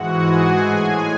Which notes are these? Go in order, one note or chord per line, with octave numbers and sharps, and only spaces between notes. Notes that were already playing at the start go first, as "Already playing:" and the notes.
Already playing: G#2 E3 G#3 F#4 F#5
G#4 G#5
A2 G#3